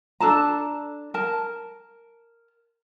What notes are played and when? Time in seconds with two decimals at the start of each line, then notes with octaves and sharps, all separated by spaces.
0.20 D4 A4 A5 A#5
1.14 A#4 A5